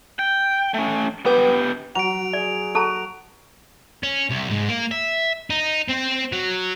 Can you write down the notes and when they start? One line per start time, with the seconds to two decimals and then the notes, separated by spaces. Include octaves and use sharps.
0.19 G5
0.74 A3 C#4
1.26 B3 G4 B4 F#5 G5
1.95 F#3 F#5 D7 F7
2.33 G#4 D5
2.75 F#4 A4 A5 A#5
4.03 C#4
4.29 C2
4.50 G#2
4.68 A#3
4.91 E5
5.50 D#4
5.88 C4
6.32 F#3